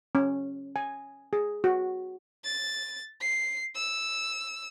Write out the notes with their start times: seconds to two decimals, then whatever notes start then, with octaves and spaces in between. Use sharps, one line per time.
0.15 C#4
0.76 G#5
1.33 G#4
1.64 F#4
2.44 A6
3.21 C7
3.75 E6